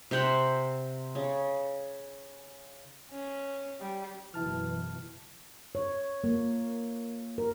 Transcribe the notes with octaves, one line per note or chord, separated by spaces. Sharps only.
C3 C4 C5 F#5
C#3
C#4
G3
F#1 B2 E3 E4 A5 F6
C#5
A#3
A#4